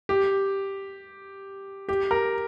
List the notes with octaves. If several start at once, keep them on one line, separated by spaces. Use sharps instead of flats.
G4
G4
A#4